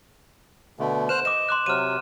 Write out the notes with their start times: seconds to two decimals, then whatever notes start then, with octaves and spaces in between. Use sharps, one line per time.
0.79 B2 D3 A3
1.09 C5 F6 F#6 E7
1.25 D#5 D6 E7
1.49 C6 D6 F#6
1.66 C3 F#3 F6 D#7